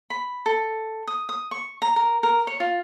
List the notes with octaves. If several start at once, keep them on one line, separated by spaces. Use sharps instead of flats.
B5
A4
D#6
D#6
C#6
A#5
A#4
A#4
C#5
F4